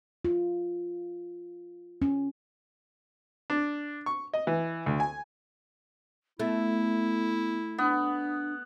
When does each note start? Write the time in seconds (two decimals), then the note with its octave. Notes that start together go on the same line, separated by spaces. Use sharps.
0.25 F4
2.02 C#4
3.50 D4
4.06 C#6
4.33 D#5
4.47 E3
4.86 D2
5.00 G#5
6.40 A3 B3 E4
7.78 B3 D4